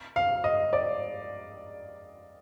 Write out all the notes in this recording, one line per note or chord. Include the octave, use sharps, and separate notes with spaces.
F5
D#5
D5